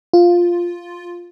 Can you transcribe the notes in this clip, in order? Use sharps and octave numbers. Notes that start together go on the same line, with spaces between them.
F4